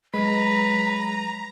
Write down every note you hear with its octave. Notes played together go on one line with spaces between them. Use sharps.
F#3 G#3 B4 A#5